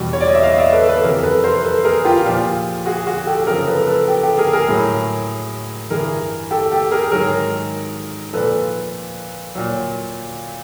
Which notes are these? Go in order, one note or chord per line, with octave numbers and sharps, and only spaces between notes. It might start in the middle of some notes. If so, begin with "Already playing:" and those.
Already playing: E2 B2 G3
C#5
D5
D#5
E5
D#5 F5
D5 E5
A4 B4
A4 B4
F2 C3 E3 G3 G#4 A#4
A4 B4
A#4 C5
A4 B4
G#4 A#4
F4 G4
A#2 F3
F#4 G#4
F#4 G#4
G4 A4
F#2 C#3 F3 G#4 A#4
A4 B4
A4 B4
G4 A4
G4 A4
G#4 A#4
G#4 A#4
A2 F#3
G2 E3 G3 G#4 A#4
G4 A4
G4 A4
G#4 A#4
G#2 D#3 F#3 G#4 A#4
A#2 F3 A4 B4
A#2 F#3